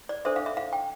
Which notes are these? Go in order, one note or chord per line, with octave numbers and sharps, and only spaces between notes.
D5
D4 A4 C5 E5
F5
E5
F5
G5